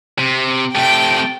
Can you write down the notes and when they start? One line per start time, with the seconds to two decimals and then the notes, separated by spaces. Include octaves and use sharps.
0.19 C3
0.76 C3 A3 G5